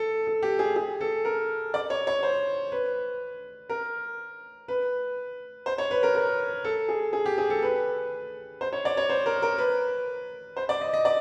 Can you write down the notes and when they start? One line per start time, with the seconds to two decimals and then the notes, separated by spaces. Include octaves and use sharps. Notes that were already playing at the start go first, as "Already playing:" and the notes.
Already playing: A4
0.27 A4
0.43 G4
0.59 G#4
0.76 G#4
1.01 A4
1.25 A#4
1.74 D5
1.90 C#5
2.07 C#5
2.23 C5
2.72 B4
3.70 A#4
4.68 B4
5.66 C5
5.78 C#5
5.91 B4
6.03 A#4
6.15 A#4
6.64 A4
6.89 G#4
7.13 G#4
7.26 G4
7.38 G#4
7.50 A4
7.62 B4
8.61 C5
8.73 C#5
8.85 D5
8.97 C#5
9.09 C5
9.26 A#4
9.42 A#4
9.58 B4
10.57 C5
10.69 D5
10.81 D#5
10.93 D#5
11.05 D5